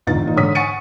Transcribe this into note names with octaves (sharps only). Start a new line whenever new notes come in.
G1 E2 G#2 D#4 F4 A6
E1 A#2 D#4
G#2 D3 C#5 D#6 B6
F#5 G#5 C#6 A6 C#7 D#7